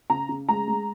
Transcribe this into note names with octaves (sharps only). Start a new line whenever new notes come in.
C#3 A#5
C#3
G#3 A#5
G#3